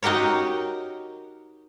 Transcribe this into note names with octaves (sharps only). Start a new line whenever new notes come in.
D#4 F#4 G4 A#4 C#5